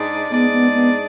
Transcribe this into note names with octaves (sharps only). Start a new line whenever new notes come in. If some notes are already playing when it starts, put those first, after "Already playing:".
Already playing: G#2 G#3 D4 G#4 D5
G#2 G#3 B3 D4 G#4 D5
B3
B3